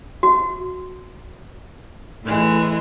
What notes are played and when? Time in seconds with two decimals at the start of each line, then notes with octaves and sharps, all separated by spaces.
0.23 F#4
2.24 A2 E3 G#3